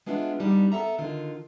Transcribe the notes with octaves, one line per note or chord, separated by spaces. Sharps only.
G#3 B3 D4 F4 E5
G3 A#3 B3 D4 D#4
B3 A4 E5 A#5
D3 D#3 F4